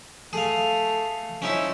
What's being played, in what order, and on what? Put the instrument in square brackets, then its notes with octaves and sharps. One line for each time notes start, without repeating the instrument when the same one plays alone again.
[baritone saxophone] A3 [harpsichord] G#4 F5
[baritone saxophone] F3 [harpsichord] C#4 D#4 E4